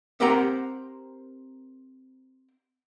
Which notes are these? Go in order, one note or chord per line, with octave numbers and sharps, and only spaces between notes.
C4 G4 A#4 C5 F#5 A#5